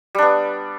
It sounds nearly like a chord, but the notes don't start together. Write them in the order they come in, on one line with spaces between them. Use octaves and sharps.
G3 D4 B3